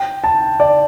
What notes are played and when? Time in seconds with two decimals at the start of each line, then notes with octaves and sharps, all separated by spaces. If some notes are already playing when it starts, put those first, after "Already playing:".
Already playing: G5
0.24 A5
0.60 D5